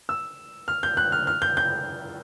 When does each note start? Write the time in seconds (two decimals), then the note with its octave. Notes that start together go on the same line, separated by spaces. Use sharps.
0.09 E6
0.68 F6
0.83 G6
0.97 F#6
1.12 F6
1.27 F6
1.42 G6
1.57 G6